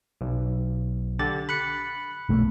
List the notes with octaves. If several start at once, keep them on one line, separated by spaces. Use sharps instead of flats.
B1
D3 G4 A6
B5 F#6 C#7
B1 A3 A#3